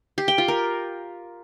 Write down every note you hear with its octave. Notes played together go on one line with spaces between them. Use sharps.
G4
G5
F4
A#4